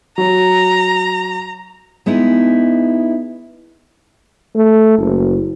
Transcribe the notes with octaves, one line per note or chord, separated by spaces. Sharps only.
F#3 A#5
G#3 B3 D#4 E4
A3
F#1